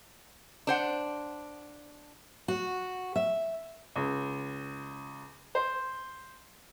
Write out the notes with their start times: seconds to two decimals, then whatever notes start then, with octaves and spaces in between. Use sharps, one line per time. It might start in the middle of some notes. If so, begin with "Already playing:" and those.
0.67 D4 C5 F#5
2.48 F#4
3.16 E5
3.96 C#2
5.55 C5